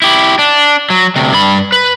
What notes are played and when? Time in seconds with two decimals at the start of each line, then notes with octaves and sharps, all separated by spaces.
0.02 E4 G4
0.39 D4
0.90 F#3
1.16 D2 C3
1.32 G2 B5
1.72 B4